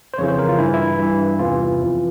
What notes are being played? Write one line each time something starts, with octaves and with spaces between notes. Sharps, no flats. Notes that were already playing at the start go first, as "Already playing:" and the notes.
C5
F2 C#3 E3 C#5
C5
A#4
F4
G2 E3 E4
E4
G2 E3
E2 C3 E3 F4
F2 E3